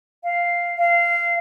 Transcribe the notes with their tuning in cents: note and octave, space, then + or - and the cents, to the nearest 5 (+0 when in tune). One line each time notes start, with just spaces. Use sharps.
F5 +0
F5 -15